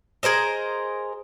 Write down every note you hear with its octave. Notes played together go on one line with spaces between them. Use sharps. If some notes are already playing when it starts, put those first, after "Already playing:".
G#4 A#4 C5 D#5